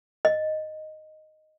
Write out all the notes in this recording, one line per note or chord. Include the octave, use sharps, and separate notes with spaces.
D#5